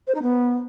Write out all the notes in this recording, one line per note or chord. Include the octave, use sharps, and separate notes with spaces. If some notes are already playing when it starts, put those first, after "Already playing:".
C5
D#4
B3